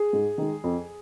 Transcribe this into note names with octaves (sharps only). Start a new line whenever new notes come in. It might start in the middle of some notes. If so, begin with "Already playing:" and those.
Already playing: G#4
G#2
D#3 G#3
F2